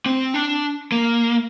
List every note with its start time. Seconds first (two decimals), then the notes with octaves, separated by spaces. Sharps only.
0.06 C4
0.34 D4
0.92 A#3